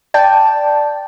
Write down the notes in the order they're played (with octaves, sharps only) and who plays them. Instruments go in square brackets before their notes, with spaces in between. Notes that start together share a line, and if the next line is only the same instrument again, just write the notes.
[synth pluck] D5 G5 A5